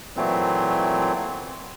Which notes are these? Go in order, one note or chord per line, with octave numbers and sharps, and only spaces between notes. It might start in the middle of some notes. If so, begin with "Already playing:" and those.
A#2 E3 F#3 A3 C4